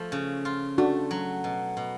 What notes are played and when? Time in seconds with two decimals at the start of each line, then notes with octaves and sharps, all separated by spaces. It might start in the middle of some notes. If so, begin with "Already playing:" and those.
Already playing: F3 A3
0.12 C#3
0.45 F4
0.78 A3 D4 F#4
1.11 F#3
1.44 B2
1.77 B2